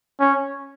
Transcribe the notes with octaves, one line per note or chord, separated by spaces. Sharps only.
C#4